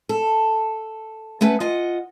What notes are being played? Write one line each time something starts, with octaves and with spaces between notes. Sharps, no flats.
A4
A3 C#4 B4 F#5
F4 D#5 F#5